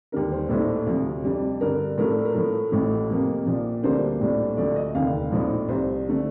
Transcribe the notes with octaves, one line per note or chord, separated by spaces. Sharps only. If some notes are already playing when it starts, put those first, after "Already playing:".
D#2 D3 G3 A#4
C5
A#1 A2 A3 D#4 C5
D2 C3 F3
F2 C3 G3 D4
G2 D3 G3 A#4
A2 F3 A3 D4 A#4
A4
A#4
A2 F3 A3
A1 A2 F3 A3
F2 C3 F3 A#3
A#1 A#2 F3
D2 D3 G3 A#3 D4 C5
A#1 A2 G3 D4
D2 D3 F3 A3 D5
D#5
F1 D#2 D3 F5
A#1 A2 F3 C4 D#4
C2 C3 G3 C4 C5
D3 A3